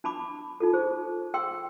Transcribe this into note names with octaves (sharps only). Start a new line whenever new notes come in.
D4 A5 B5 D6
D#4 F4 A4
G#4 C5
G#4 G5 C6 E6